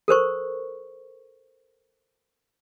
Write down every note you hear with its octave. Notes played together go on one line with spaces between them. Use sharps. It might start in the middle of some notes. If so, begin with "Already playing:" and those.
A4 A#4 C5 C#6